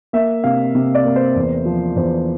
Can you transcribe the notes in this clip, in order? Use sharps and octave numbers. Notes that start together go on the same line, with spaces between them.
A#3 E5
C3 F5
C3
D5
A#3
C5
E2
F3
E2 C5